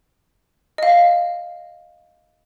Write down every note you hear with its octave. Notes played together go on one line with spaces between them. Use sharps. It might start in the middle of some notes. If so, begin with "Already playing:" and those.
D#5 F5